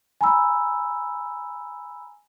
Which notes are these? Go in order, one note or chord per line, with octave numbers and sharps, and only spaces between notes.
G#5 A#5 B5 E6